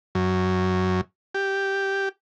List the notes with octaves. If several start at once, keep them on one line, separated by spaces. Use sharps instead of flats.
F#2
G4